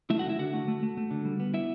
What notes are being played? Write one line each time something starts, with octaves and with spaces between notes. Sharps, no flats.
A3 E4 E5
F#4 F#5
D3
E4 E5
D3 F#4 F#5
A3
A3
A3
A3
D3
G3
B3
B3 E4 E5